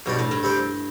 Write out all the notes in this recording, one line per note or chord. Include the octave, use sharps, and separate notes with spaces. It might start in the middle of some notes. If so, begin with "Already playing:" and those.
B1 G2 B2 G3 D4
A2
G2
C3 G3 C4 G4 C5